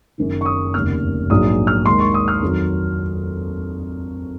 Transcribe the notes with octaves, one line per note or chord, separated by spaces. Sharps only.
F#1 F#2 D#3
C#6
D#6
F1 D#2 C#3 F6
A#1 G#2 F#3 D#6
F6
D#2 D#3 G#3 C6
C#6
D#6
F6
F2 D#3 F#3